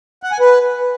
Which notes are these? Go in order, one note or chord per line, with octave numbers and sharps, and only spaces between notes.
F#5
G#5
B4